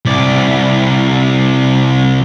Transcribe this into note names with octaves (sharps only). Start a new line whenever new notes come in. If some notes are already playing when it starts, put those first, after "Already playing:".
C2 D5